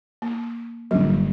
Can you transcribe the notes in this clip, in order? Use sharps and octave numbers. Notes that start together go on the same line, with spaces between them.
A#3
G1 G2 D3 F#3 G3 A#3